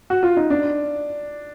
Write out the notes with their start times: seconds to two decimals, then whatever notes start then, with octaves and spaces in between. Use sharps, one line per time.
0.10 F#4
0.23 F4
0.37 D#4
0.50 D4